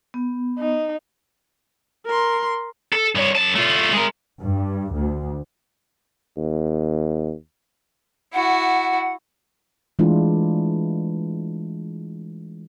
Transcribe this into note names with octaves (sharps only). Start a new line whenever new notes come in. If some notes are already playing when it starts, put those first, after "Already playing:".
B3
D#4
A#4 C6
A4
G2 C#5
F#2 A5
A3 F4
G#3 A#4
G2
D2
D#2
E4 F#4 F#5
E3 G#3 A3 D4 E4 F4